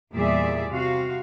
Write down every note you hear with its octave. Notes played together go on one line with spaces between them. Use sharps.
E2 A#2 G3 G#4 D5 E5
C3 F#4 F5